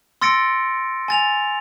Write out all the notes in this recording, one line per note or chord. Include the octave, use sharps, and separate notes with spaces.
C6 E6 A6 A#6 C#7 D7
G#5 A6 F7